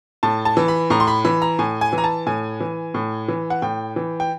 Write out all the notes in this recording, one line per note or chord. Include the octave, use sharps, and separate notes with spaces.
A2 A5
A5
E3
B5
A2 A#5
C6
B5
E3 B5
A#5
A2 G#5
G#5
E3
A#5
A5
A2 G#5
E3
A2
E3
F#5
A2 G5
E3
G5